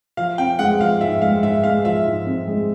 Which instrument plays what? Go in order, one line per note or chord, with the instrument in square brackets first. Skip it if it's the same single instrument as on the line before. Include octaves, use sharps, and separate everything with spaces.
[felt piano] F3 [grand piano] F5
[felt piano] C4 [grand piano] G5
[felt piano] G#3 [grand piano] F#5
[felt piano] F3 [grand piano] F5
[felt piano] G#2 [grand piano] E5
[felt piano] G#3 [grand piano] F5
[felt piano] G#2 [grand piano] E5
[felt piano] G#3 [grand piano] F5
[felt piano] F3 [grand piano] E5
[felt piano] G#2
C4
G#3